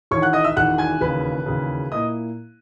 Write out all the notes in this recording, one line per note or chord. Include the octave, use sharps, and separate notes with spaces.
E1 E2 D#3 C#5 C#6
F#5 F#6
D#5 D#6
E5 E6
E1 E2 D#3 F#5 F#6
G#5 G#6
E1 D#2 C#3 B4 B5
E1 D#2 C#3
A#2 A#3 E4 D#5 D#6